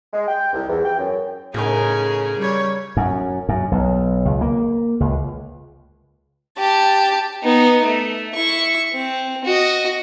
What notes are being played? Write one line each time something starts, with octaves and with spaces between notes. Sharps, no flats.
G#3
G5
C2
E2
G5
F#2
A2 C#3 C#4 D#4 G#4 A#4
G3 C#5
F#2
F#2
B1
C#2
A#3
C#2
G4 A5
B3 D#4
A3
E4 C#6
C4
F#4 D#5